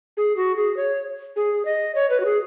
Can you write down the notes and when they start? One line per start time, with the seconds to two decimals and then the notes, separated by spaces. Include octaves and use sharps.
0.17 G#4
0.37 F#4
0.57 G#4
0.77 C#5
1.36 G#4
1.65 D#5
1.95 C#5
2.10 B4
2.20 F#4
2.25 G#4